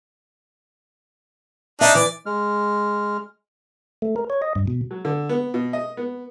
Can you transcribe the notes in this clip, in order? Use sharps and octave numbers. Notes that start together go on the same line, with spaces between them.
D4 D#4 E5
E3 D5
G#3 F6
A3
A#4
C#5
D#5
G2
B2
F#3
D3
B3
B2
D#5
B3